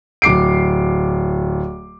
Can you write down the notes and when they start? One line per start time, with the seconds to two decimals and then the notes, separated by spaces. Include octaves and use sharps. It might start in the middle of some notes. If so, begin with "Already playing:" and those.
0.22 D1 D6 C7 D7